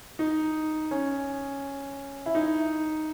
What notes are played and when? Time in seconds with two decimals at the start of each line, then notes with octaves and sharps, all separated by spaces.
0.19 D#4
0.91 C#4
2.26 E4
2.35 D#4